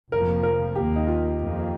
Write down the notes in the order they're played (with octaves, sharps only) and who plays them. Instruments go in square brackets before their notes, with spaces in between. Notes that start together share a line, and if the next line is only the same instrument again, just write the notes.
[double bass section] F1 F2 F3 A#3 [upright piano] A#4
[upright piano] A#4
[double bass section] D#2 D#3 A#3 [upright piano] G4
[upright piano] D#4
F4
[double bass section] F2 D#3 A#3